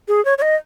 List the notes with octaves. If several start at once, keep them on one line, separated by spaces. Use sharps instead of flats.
G#4
C#5
C#5
D#5